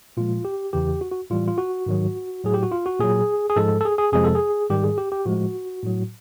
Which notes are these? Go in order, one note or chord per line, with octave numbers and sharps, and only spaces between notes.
A#2 F3 G#3 F4
G4
E2 C#3 E3 G4
F#4
F#4
A2 E3 G3 F4
F4
F#4
G#2 D#3 F#3
A2 F#3 G#4
G4
F#4
F4
F#4
A#2 F#3 G#4
G#4
G#2 F3 G#3 A4
A4
G#4
G#4
F2 C3 F3 G#3 G#4
A4
G#4
G#2 D#3 G3 G4
G#4
G4
G4
A2 F3 G#3 F#4
A2 F#3